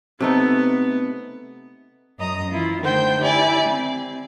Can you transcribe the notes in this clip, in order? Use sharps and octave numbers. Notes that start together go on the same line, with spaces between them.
C3 A3 B3 D#4
F#2 C#4 D#5 A#5 D#6
E3 E4 F4
D3 D#3 A3 C5 G5 G6
E4 G4 D5 G#5
C4